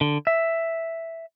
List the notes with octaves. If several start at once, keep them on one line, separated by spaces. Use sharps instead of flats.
D3
E5